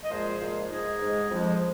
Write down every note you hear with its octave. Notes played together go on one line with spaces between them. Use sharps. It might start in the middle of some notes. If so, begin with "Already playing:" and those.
D#5
A#2 F3 G#3 G#4 C5
A#2 F3 G#3
G#2 G#3 D#4 G#4
G#2 G#3
F2 F3 G#3